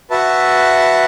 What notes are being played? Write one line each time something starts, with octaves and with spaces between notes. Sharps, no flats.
F#4 B4 E5 A5